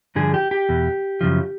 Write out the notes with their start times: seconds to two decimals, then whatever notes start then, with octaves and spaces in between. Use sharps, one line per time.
0.15 G2 D3 F3 G#4
0.34 G4
0.51 G4
0.69 E2 B2
1.21 F#2 C#3 F3